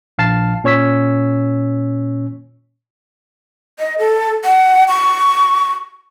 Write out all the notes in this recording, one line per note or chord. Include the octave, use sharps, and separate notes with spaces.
A#1 F5 A5 A6 C7
A#2 C#4 C#5 E6 B6
D#5
A4
F#5
C#6